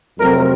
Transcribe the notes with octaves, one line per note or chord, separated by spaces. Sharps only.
F2 C3 F#3 A3 C4 A#4